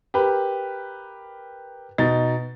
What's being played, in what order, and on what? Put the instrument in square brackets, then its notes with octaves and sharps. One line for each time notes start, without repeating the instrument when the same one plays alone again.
[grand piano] G4 A#4 B4
B2 D#4 A6